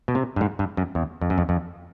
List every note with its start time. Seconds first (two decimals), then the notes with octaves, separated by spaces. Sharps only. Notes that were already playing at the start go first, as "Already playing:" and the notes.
0.08 B2
0.15 C3
0.36 G2
0.41 G#2
0.59 G2
0.77 F#2
0.95 E2
1.21 F2
1.30 F#2
1.38 F2
1.49 F2